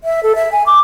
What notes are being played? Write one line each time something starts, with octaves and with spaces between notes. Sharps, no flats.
E5
A4
E5
G#5
D6